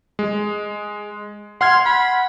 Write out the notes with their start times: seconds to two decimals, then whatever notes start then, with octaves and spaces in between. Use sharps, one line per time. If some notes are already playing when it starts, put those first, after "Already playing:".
0.19 G#3
1.61 F#5 C6 F6 G#6
1.86 B5